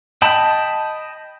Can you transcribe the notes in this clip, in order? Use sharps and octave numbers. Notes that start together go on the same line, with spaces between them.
D#5 G5 A5 B5